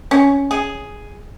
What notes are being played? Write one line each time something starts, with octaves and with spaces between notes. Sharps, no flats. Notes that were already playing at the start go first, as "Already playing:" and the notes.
C#4
G#4